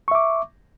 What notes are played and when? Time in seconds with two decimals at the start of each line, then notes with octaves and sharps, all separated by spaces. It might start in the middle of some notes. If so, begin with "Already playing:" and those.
0.08 C#6
0.11 E5
0.15 D6